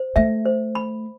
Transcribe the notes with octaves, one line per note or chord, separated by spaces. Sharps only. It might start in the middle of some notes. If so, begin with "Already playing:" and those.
Already playing: C5
A3 E5
C5
B5